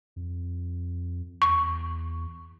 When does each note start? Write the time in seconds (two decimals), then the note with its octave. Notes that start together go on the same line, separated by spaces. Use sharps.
0.16 F2
1.42 E2 C#6